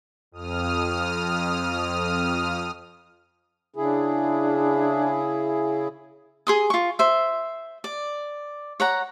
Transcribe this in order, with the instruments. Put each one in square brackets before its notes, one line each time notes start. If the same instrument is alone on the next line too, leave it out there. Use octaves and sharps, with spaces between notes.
[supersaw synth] F2 D#6 F6
[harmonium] C#3 E4 G#4 [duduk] D4
[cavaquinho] G#4 C6 D#6
F4 C#6
C5 E5
D5
C#5 F#5 A#5